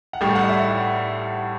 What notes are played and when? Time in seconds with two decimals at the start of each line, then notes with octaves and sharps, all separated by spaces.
0.13 F#5
0.21 A1 A2 G3 G5
0.36 F#5
0.44 D5
0.49 E5